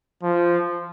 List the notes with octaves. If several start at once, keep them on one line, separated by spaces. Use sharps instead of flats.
F3